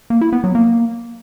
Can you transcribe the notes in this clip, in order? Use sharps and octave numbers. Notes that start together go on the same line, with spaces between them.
A#3
E4
B3
F#3
A#3